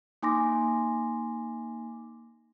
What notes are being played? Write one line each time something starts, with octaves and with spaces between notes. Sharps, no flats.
A#3 D#4 G#5 C6 D6 A#6